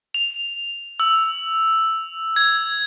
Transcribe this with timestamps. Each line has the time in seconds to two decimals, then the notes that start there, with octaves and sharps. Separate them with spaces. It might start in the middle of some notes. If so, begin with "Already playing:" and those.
0.14 F7
1.00 E6
2.36 G#6